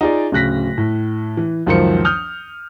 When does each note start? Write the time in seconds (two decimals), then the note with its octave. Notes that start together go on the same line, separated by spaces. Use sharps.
0.01 D#4 F4 G#4 D5
0.32 D1 C#3 F#6 A#6 B6
0.78 A2
1.37 E3
1.66 C#2 F#2 D#3 F3 C5 C#7
2.05 D#6 F6 G6